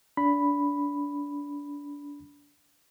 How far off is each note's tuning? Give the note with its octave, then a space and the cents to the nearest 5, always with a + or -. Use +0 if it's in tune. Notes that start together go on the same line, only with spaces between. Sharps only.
D4 -25 B5 +0